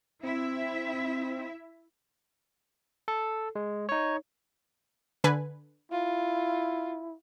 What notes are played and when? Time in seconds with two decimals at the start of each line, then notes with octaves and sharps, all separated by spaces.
0.23 C4 E4 E5
3.08 A4
3.55 G#3
3.89 D#4 C#5
5.24 D3 B4 G#5
5.92 E4 F4